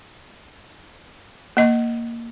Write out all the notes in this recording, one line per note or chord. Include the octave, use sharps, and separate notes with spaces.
A#3 D#5